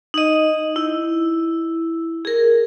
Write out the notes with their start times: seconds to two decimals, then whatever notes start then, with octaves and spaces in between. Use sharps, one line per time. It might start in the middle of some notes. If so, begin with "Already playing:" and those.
0.14 D#4 D#5
0.76 E4
2.25 G#4 A#4